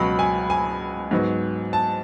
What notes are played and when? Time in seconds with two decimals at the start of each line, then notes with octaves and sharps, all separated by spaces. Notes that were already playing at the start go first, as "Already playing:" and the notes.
Already playing: C#2 B2 F#3 B5
0.19 G#5
0.50 G#5
1.11 G#2 F#3 B3
1.73 A5